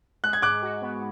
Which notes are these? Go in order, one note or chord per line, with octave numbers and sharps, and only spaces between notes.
G#3 F#6
G#6
G#2 D6 F#6
F#4
B3